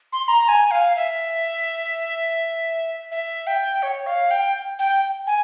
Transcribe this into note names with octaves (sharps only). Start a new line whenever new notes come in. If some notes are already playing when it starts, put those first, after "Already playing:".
C6
C6
A#5
G#5
F5
E5
E5
G5
C#5
F5
G5
G5
G#5